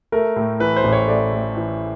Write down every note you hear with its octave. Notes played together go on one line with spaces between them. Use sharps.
A3 A#4
A2
E3 B4
C5
A1
C#5
A3 D5
A2
E3